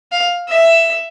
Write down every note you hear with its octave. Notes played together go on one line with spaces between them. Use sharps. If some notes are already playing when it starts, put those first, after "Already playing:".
F5
E5